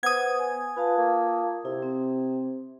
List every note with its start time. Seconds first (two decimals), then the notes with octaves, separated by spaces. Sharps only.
0.03 B3 C5 D#6 G#6
0.39 G#5
0.76 F4 B4 F5 A5
0.98 A#3
1.65 C3 E4
1.82 C4